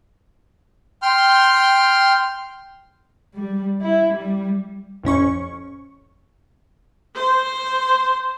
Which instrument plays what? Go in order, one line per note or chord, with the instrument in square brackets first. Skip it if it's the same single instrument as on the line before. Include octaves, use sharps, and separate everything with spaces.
[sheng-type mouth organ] G5 C6 F6
[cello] G3
E4
G3
[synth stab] A1 F2 C#4 C#6
[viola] C5